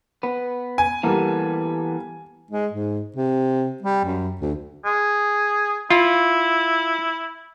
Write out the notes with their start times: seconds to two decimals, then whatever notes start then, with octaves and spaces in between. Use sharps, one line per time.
0.23 B3 B4
0.78 G#5
1.03 E3 G3 A#3 B3 A4
2.51 G#3
2.72 G#2
3.16 C3
3.83 G3
4.05 F#2
4.41 D2
4.86 G#4
5.90 E4 F4